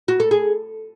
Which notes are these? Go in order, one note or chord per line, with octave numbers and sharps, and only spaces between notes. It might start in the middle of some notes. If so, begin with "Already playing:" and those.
F#4
A4
G#4